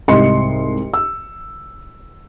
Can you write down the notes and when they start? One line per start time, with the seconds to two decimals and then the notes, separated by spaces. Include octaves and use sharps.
0.08 C2 G#2 G3 D#5 C6 C#7
0.94 E6